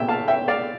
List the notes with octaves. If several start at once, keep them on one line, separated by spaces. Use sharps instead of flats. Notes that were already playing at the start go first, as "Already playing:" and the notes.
Already playing: A#2 E5 G5
F5 A5
E5 G5
D5 F5